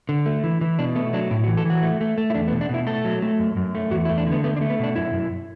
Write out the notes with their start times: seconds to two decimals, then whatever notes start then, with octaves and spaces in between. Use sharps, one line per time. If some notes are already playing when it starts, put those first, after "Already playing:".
0.09 D3
0.26 A3
0.44 E3
0.61 E3
0.79 B2 D4
0.95 A3 B3
1.13 F#3 D4
1.30 A2 E4
1.44 F#4
1.48 E3
1.57 A4
1.65 E3 F#4
1.83 A3
2.01 A3
2.18 A3
2.30 E4
2.35 E2 D4
2.48 B3
2.52 B2
2.61 D4
2.69 B2 E4
2.87 A3 A4
3.05 F#3
3.22 A3
3.39 F#2
3.57 F#2
3.75 A3
3.91 E2 F#4
4.05 E4
4.09 A3
4.18 D4
4.27 D3 B3
4.44 A3 B3
4.57 D4
4.61 A3
4.70 B3
4.79 B2 D4
4.96 F#2 E4
5.13 F#2